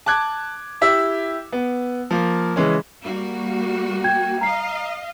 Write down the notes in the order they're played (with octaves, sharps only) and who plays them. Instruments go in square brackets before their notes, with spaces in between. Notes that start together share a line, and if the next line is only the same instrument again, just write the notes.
[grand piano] A5 D6 F#6 G#6
E4 G4 E5 E6
B3
F3 A#3
C#3 E3 G#3 C#4
[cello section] G3 A#3 F#4
[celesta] G5 G6 G#6
[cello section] D#5 F5 [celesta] A#5 C7